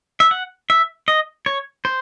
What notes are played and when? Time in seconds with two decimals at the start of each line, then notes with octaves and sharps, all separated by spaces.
0.20 E5
0.31 F#5
0.70 E5
1.08 D#5
1.46 C#5
1.85 C5